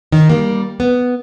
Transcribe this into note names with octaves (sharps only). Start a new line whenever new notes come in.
D#3
G3 A#3
B3